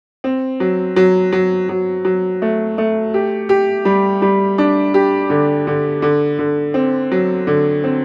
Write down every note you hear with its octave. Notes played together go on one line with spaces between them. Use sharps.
C4
F#3
F#3
F#3
F#3
F#3
A3
A3
G4
G4
G3
G3
D4
G4
D3
D3
D3
D3
C4
F#3
D3
C4